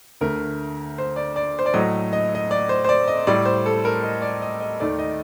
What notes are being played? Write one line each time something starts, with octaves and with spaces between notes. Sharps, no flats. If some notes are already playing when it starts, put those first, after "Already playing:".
D2 D3 A3 A#4
C5
D5
D5
C5
D5
A2 F#3 A3 D#5
D#5
D#5
D5
C5
C5
D5
D#5
A2 G3 D5
C5
A4
A#4
D#5
D5
D#5
D#5
D#2 D#3 A3 D5
D#5